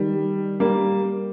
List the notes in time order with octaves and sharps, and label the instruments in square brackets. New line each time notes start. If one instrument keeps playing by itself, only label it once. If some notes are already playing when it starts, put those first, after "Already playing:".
Already playing: [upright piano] D#3 G3
G3 A#3